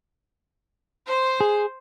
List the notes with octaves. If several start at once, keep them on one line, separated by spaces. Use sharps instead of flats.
C5
G#4